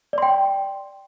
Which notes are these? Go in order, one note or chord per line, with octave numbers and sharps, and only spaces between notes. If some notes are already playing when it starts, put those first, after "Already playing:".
D5 G5 C6